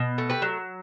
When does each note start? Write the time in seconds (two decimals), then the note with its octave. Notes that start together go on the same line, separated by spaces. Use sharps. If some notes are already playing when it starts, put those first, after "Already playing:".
Already playing: B2
0.18 A3
0.30 G4 B4
0.42 F#3